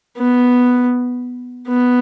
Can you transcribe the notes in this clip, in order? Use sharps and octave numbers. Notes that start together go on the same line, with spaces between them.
B3
B3